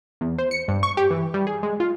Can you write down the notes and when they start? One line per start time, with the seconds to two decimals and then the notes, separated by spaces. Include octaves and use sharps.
0.21 E2
0.38 C5
0.51 C#7
0.68 G2
0.83 C#6
0.97 G4
1.11 E3
1.34 G3
1.47 G#4
1.63 G#3
1.80 F4